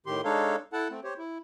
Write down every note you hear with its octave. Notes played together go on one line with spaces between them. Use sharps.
A2 D#3 G4 C6
G#3 D4 D#4 A4 C#5 F5
E4 A4 F#5 A5
A3 C4
G4 C5 C#5
E4